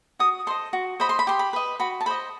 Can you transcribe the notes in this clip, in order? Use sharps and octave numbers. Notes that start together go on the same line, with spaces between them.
F#4 D#6
A4 C5 D#5 C6
F#4
C5 D#5 B5
C6
B5
G4 C6
B5
B4 D#5
F#4 B5
A5
C5 D#5 B5